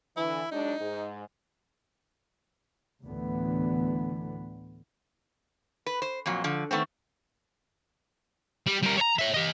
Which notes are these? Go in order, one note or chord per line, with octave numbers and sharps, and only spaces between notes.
D3 E3 E4
F#3 G#3 D4 D#4
G#2
D2 A2 D3 E3 B3
B4
C5
F2 A#2 F#3
D3 F3
D#3 A3 B3 C4
G3
G3 A#4
C#5 A#5
C#5 E5
G4 D#5